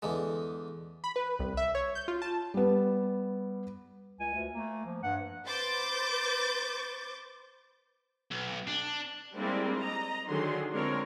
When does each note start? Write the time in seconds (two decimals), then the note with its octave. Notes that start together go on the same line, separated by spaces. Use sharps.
0.02 E2 D3 G#3
1.04 B5
1.16 B4
1.39 C2
1.57 E5
1.75 C#5
1.95 G6
2.08 F4
2.22 A5
2.54 G3 B3
4.20 C#2 G#5
4.34 D2
4.53 A3 A#3
4.85 F3
5.03 G2 F#5
5.46 B4 C5 D6 G6 A6
8.31 B1
8.67 D4
9.36 G3 G#3 A#3 C4 D4 E4
9.78 D#5 A#5
10.29 D3 D#3 F#3 G#4 C6
10.73 D3 G#3 C4 F4 A#4 C#5